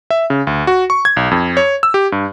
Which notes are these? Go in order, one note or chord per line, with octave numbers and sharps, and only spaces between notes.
E5
C#3
D2
F#4
C#6
G#6
B1
F2
C#5
E6
G4
G2